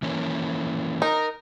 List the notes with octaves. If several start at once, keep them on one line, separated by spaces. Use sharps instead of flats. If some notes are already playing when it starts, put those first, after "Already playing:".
E3 A#3 C#4
D#4 A#4